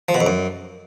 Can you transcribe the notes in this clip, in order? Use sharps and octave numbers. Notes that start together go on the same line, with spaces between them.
F3
B2
F2
F#2